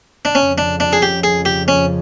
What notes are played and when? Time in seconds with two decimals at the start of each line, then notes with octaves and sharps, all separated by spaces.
0.25 D4
0.35 F2 C#3 F3 C#4
0.58 D4
0.80 D4
0.93 G#4
1.02 G4
1.24 G#4
1.45 G4
1.68 C#4